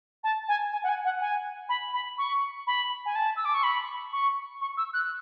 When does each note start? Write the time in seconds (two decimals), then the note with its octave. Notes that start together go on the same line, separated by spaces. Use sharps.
0.24 A5
0.48 G#5
0.72 G#5
0.83 F#5
0.89 G#5
1.05 F#5
1.21 G#5
1.69 B5
1.94 B5
2.18 C#6
2.67 B5
3.06 G#5
3.15 A5
3.36 E6
3.45 D6
3.54 C#6
3.63 B5
4.13 C#6
4.61 C#6
4.77 E6
4.93 F#6